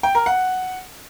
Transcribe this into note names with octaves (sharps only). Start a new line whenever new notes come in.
G5
A#4
F#5